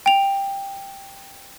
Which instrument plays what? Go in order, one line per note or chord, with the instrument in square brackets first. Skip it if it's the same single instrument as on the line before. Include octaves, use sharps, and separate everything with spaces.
[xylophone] G5 F7